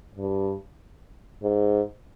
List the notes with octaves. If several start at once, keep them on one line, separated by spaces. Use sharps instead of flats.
G2
G#2